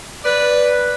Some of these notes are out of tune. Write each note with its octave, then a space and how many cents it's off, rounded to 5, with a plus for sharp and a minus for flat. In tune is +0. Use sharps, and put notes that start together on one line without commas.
B4 +0 D5 +0